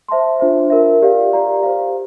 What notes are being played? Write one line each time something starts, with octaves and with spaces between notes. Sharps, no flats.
C5 E5 A5 C6
D4 F4 C5 E5
F4 A#4 E5
G4 D5 F5
G4 D5 F5 A#5
G4 C5 F5